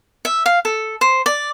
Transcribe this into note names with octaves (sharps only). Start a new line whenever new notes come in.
E5
F5
A4
C5
D5